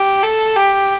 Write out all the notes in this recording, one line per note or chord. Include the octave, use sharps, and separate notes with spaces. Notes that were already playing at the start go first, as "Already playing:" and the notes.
Already playing: G4
A4
G4